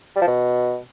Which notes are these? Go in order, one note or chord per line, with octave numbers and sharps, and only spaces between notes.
G3
F3
B2